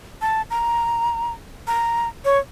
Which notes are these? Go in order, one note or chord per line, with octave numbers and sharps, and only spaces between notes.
A5
A#5
A#5
C#5